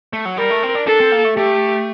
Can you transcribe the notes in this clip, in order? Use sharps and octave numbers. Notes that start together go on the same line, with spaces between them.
A3
F#3
G3 A#4
A3
C4
D4
D4 A4
C4
A#3
A3
A3 G4